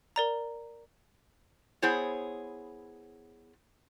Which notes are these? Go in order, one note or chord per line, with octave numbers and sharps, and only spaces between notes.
A#4 D5 A#5
B3 E4 G#4 C5 C#5